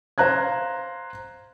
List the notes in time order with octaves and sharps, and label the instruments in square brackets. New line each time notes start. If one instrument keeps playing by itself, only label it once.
[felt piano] C5 F5 A#5 F#6 G#6